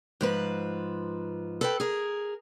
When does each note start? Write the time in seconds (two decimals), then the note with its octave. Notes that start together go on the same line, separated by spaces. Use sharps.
0.21 G#2 F3 B4
1.61 A4 B4 G5
1.80 G#4 A#4